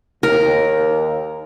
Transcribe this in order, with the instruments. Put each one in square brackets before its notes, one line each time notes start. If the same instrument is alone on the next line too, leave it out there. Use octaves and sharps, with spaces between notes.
[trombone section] D#2 [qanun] A#4